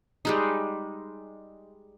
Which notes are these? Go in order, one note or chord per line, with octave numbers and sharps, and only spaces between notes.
G3 G#3 D#4